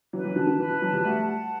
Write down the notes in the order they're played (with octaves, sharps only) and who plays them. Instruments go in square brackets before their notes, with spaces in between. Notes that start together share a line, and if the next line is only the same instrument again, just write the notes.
[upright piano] E3 F#3 [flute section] B4
[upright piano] E3 F#3
[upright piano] D#3 F3 [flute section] A5
[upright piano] D#3
[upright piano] E3 [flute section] B4
[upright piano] E3
[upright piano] E3 F#3 [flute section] A5
[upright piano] F3 G3
[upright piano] G3 A3 [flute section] F#5
[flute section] A5